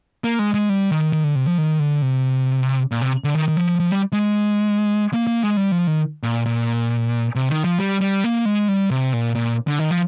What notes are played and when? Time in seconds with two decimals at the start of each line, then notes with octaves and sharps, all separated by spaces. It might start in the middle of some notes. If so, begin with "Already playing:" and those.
0.24 A#3
0.39 G#3
0.54 G#3
0.69 G3
0.91 D#3
1.13 D#3
1.24 D3
1.35 C3
1.47 F3
1.58 D#3
1.79 D3
2.02 C3
2.92 A#2
3.01 C3
3.24 D3
3.35 D#3
3.48 D#3
3.57 F3
3.80 F3
3.91 G3
4.13 G#3
5.13 A#3
5.27 A#3
5.43 G#3
5.57 G3
5.71 F3
5.87 D#3
6.23 A#2
6.46 A#2
7.35 C3
7.49 D#3
7.64 F3
7.79 G3
8.01 G3
8.24 A#3
8.45 G#3
8.68 G3
8.91 C3
9.13 A#2
9.35 A#2
9.67 D3
9.79 D#3
9.91 F3